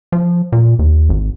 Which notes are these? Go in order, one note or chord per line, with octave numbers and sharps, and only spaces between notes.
F3
A#2
D#2
G#1